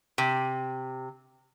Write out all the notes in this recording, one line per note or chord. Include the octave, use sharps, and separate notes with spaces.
C3